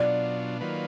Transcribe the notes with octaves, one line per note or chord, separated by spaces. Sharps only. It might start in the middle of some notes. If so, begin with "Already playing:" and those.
Already playing: B2 F#3 D4 F4 D5
D#3 F#3 A#3 F4 B4